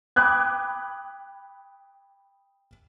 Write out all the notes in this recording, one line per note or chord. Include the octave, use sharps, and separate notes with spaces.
G5 B5 D6 D#6 F#6 G#6